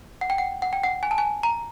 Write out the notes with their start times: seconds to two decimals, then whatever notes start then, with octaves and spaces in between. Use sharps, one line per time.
0.21 F#5
0.30 G5
0.38 F#5
0.62 F#5
0.73 G5
0.84 F#5
1.03 G#5
1.11 A5
1.18 G#5
1.43 A#5